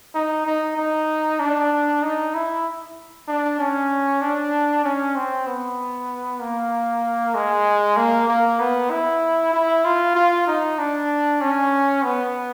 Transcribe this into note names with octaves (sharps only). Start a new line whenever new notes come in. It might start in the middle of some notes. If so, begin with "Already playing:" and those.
D#4
D#4
D#4
D4
D#4
E4
D4
C#4
D4
C#4
C4
B3
A#3
G#3
A#3
A#3
B3
E4
E4
F4
F4
D#4
D4
C#4
B3